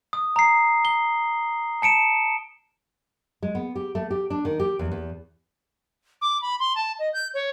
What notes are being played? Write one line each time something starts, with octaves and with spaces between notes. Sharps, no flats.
D#6
A#5 C7
G7
A5 C#7 D7 E7
G#3
B3
G4
A3
G4
D4
D#3
G4
E2
E2
D6
B5
C6
A5
D#5
G6
C#5